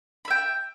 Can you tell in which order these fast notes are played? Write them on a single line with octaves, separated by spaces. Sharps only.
B5 E5 G5